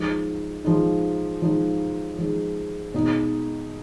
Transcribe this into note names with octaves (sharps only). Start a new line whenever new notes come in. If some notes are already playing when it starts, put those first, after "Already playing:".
Already playing: F3 G#3 D#4
F3 G#3 D#4
F3 G#3 D#4
F3 G#3 D#4
B2 G#3 D#4